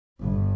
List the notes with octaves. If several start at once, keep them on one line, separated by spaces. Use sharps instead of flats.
G1